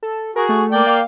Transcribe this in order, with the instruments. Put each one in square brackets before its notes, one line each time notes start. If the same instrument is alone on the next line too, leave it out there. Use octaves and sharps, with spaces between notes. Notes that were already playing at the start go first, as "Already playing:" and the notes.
[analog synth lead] A4
[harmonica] F#4 G#4 [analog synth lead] A#4
[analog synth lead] A3
[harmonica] A#3 D5 G5
[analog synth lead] F5